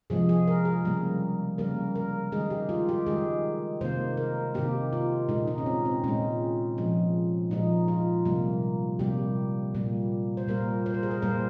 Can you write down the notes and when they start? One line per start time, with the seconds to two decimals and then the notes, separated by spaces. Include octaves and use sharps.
0.10 C3 F3 G#3 G#4
0.29 G#4
0.47 A#4
0.65 G#4
0.85 C#3 G3 A#3
1.58 C#3 G3 A#3 A#4
1.96 A#4
2.32 D#3 G#3 G#4
2.50 G4
2.69 F4
2.89 G4
3.06 D#3 G#3 G#4
3.81 C3 D#3 A#3 C5
4.17 A#4
4.54 C3 D#3 A#3 G4
4.93 F4
5.29 A#2 G#3 D#4
5.47 D#4
5.58 C#4
5.66 C4
5.85 C4
6.04 A#2 G#3 C#4
6.78 A#2 F3 G#3
7.51 A#2 F3 G#3 D#4
7.88 F4
8.25 C3 G3 A#3
8.99 C3 G3 A#3 G4
9.75 A#2 G3 A#3
10.37 C5
10.48 A#2 G3 A#3 A#4
10.86 C5
10.94 A#4
11.03 G#4
11.11 A#4
11.22 A#2 G3 A#3 C5